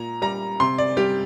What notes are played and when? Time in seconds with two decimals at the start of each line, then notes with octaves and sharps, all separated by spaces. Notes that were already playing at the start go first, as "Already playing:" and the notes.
Already playing: A#2 A#5
0.22 G3 A#5
0.60 C3 C6
0.78 D5
0.97 G3 G4